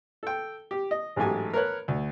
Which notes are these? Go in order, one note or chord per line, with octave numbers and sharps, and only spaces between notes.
A4 G5
G4
D#5
A1 G#2 F#3 A3 G4 G#5
A#4 B4 C#5 F#6
D2